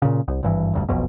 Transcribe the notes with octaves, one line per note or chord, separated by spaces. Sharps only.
A#2 C#3
C2
G#1 G2 E3
F1 D2 G2
F#1 B1 F2 B2